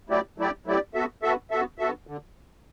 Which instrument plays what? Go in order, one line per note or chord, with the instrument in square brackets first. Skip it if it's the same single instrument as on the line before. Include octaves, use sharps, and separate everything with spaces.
[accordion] F#3 A3 E4 G4 D5
F#3 A3 E4 G4 D5
F#3 A3 E4 G4 D5
B3 F#4 A4 E5
B3 F#4 A4 E5
B3 F#4 A4 E5
B3 F#4 A4 E5
D3